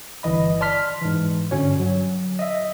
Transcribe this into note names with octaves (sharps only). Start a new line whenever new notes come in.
G1 E3 D#5 B5
D5 A5 C6 F6 B6
G#2 E3
G2 D3 C#4 F#4 C#5
F#3
D#5 E5